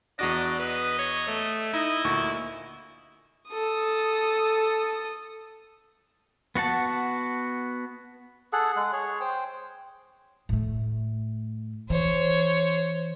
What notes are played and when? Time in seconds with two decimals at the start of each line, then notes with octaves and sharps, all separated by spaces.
0.19 E2 D4 F#4 D#5 A#6
0.59 B4 D#5
0.99 C#5
1.27 A3
1.73 D#4 E4 D#5
2.04 D2 A#2 C#6
3.49 A4 D#6
6.55 B3 F#4 F#5 A5
8.53 G#4 A4 F#5
8.76 G#3 F#5
8.93 G#4 C#5
9.20 C5 G5
10.49 A2 A3
11.90 E3 C5 C#5